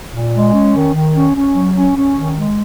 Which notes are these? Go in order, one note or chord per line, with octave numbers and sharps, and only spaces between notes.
A#2
G#3
C#4
D#3
D#3
C#4
C#4
F#3
C#4
C#4
D#3
G#3